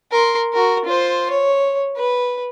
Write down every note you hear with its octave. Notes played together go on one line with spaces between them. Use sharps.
A#4 C6
F#4 A#4
F4 C5
C#5
B4